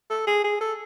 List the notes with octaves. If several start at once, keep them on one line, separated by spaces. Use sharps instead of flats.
A4
G#4
G#4
A4